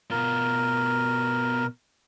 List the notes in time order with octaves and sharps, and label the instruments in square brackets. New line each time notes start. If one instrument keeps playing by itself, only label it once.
[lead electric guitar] B2 F4 [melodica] A#4